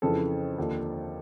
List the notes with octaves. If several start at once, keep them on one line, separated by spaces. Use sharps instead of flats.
F2 C#3 E3 A4
D#2 D3 F3